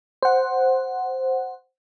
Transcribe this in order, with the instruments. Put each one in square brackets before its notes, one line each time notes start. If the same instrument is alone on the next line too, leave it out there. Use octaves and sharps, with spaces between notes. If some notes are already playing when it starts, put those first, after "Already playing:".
[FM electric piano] C5 F#5